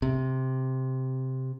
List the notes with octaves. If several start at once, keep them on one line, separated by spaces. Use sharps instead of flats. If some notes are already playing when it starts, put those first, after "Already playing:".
C3